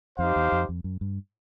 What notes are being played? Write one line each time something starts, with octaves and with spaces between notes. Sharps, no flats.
F2 D#4 G4 C5 F5
E2
F2
F2
F#2
G2